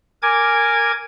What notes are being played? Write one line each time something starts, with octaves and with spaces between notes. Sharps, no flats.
A#4 G#5 D6 G#6